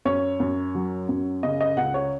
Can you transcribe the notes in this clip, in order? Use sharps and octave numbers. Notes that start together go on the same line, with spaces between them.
F#2 C#5
F#2
F#3
F#2
C#3 D#5
D#5
C#2 F#5
C#5